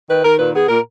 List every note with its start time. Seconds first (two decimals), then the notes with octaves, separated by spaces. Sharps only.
0.09 D#3 B4
0.24 D#3 A#4
0.39 A#2 B4
0.54 B3 G#4
0.68 A#2 A#4